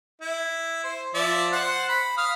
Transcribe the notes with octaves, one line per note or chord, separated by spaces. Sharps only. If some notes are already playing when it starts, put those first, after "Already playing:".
E4
C5
F3 D5 E5
C5 F#5
B5
F5 D#6 F6